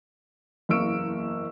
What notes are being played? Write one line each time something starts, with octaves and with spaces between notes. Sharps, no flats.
F#1 E2 A#3 C#6 E6 D7